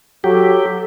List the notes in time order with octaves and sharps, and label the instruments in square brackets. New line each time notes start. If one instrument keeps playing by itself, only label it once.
[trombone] F#3 [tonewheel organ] G4 [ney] A4